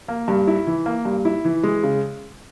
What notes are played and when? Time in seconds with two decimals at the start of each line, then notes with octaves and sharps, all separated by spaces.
0.08 A#3
0.28 G2
0.47 E4
0.67 E3
0.86 A#3
1.05 G2
1.25 E4
1.45 E3
1.63 G#3
1.83 C#3